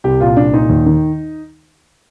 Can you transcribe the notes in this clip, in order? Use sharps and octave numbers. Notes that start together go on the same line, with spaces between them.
C2 G4
A#2 F4
C2 D4
A#2 D#4
D#2
D#3